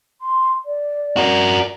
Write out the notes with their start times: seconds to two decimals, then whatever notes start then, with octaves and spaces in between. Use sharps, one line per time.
0.21 C6
0.65 D5
1.17 F#4 A#4